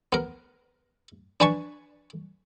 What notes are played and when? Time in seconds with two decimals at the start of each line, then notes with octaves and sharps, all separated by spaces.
0.13 B3 A#4
1.40 D4 B4 G#5 A5 C#6